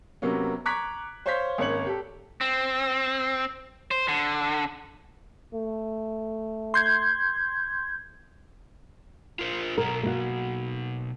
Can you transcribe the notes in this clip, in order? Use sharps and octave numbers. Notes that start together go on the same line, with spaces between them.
C3 F#3 A#3 B3 C#4
A#5 C#6 D6 F#6 G#6 B6
C5 C#5 F5 C6 G6 B6
G#1 A#3 C#4 C#5 C#7 F#7
G4 A4
C4
C5
D3
A3
C6 G6 G#6
F4 A#4 C5
B2 F#3 A#4
A#3 F#4